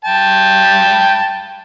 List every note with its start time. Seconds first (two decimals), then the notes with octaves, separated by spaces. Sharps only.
0.05 G5 A5